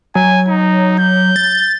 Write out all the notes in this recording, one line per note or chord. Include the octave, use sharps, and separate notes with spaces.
F#3 G#5
D#4
G6
A6